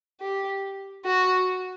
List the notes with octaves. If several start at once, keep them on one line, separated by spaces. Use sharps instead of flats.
G4
F#4